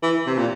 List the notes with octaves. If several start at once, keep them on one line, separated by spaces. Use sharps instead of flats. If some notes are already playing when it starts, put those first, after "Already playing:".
E3
C3
A#2